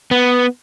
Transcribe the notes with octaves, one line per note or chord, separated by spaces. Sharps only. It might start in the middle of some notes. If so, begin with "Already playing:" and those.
B3